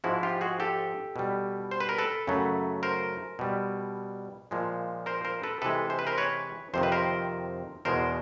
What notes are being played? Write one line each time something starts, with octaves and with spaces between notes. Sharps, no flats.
G#2 F3 G#3 E4 F#4
F4 G4
F#4 G#4
G4 A4
B2 G3
C5
B4
A#4
A4 B4
F#2 C#3 F#3 A3
A#4 C5
B2 G3
A#2 F3 G#3
A#4 C5
A#4 C5
A4 B4
C3 E3 G#3 A4 B4
C5
B4
A#4 C5
B4 C#5
F2 C3 D#3 C5
B4
A#4 C5
E2 B2 G#3 A#4 C5